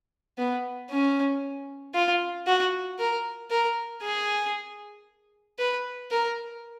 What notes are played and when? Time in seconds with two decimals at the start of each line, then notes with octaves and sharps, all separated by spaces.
0.38 B3
0.90 C#4
1.95 F4
2.47 F#4
2.99 A#4
3.50 A#4
4.02 G#4
5.59 B4
6.11 A#4